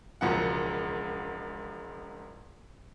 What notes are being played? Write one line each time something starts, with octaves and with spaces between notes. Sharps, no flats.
E1 C#2 F3 F#4 A#4 F#5